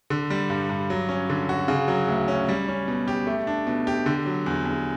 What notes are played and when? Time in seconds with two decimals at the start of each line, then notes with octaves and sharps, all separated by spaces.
0.10 D3
0.30 G3
0.50 G2
0.69 G2
0.90 F#3
1.09 C#4
1.30 D3
1.49 F#4
1.68 C#3
1.88 F#3
2.08 D2
2.28 C#4
2.48 G3
2.68 C#4
2.88 B2
3.08 G4
3.27 A3
3.47 D4
3.67 B2
3.87 G4
4.06 D3
4.26 F#3
4.46 E2
4.65 E2